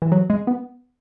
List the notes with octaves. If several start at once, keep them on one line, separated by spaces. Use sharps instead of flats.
E3
F#3
G#3
B3